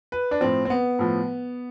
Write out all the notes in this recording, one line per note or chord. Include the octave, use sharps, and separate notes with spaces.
B4
D4
A2 F3 C4
C4
B3
A2 F3